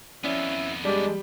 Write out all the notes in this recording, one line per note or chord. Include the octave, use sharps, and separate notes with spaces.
F2 B3 C#4 E4 D5 E5
G3 G#3 D4 G4 D5